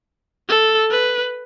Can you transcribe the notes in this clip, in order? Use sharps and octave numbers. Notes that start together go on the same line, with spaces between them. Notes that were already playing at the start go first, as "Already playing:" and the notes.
A4
B4